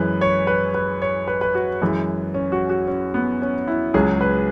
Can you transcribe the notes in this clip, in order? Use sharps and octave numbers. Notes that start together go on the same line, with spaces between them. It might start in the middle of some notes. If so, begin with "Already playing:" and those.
Already playing: F#2 E3 G#3 B4
C#5
B4
B4
C#5
B4
B4
F#4
F#2 E3 G#3
C#4
F#4
F#4
C#4
B3
C#4
E4
C#2 C#3 F#3 G#4
B4